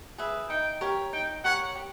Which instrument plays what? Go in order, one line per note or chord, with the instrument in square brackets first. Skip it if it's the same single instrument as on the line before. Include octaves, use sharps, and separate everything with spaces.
[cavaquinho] G#4 B4 E5
[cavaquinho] D#4 [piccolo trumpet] G5
[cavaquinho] G4 A#4 C#5
[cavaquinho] D#4 [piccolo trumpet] G5
[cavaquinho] G4 A#4 C#5 [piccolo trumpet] F#5
[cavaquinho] G4